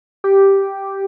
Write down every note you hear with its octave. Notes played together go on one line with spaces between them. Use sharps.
G4